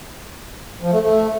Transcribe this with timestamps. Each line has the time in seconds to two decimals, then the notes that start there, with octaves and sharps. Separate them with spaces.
0.82 F3
0.92 A3
1.03 A3